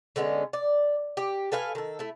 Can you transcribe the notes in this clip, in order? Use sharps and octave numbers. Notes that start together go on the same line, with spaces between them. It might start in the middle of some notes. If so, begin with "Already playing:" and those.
D3 G#3 B3 C#4
D5
G4
A4 B4 F5 G#5
D#3 A4
A3 E4